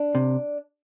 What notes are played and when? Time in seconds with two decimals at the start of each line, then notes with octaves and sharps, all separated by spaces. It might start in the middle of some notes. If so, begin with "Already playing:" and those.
Already playing: D4
0.15 C3